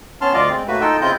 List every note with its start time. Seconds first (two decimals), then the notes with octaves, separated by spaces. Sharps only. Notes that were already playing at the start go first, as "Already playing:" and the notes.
0.21 B3 C#4 A5 C6 F6
0.34 D2 F4 D5 D#5 F5
0.50 G#3 C4
0.68 A2 A3 A#3 F#4 B4
0.81 D#4 F4 A4 D#5 G5 E6
1.01 C#3 C4 E4 F4 D#5 G6